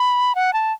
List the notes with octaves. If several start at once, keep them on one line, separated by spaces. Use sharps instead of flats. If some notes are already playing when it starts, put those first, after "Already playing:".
Already playing: B5
F#5
A5